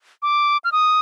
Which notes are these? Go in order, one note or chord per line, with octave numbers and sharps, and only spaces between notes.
D6
F6
D#6